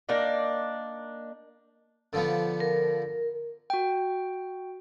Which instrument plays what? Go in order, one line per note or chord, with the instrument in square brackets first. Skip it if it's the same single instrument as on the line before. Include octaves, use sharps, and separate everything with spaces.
[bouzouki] A#3 D4 D#4 D5
[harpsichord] D3 F3 B3
[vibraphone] A#4
[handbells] F#4 G5